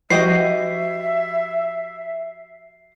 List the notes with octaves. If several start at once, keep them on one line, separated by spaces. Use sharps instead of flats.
F3 F#4 G4 D#5 E5 C7